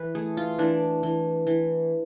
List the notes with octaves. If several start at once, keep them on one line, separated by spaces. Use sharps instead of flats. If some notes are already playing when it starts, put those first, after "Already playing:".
Already playing: E3 B4
A3 G#4
F4
E3 D4
E3
E3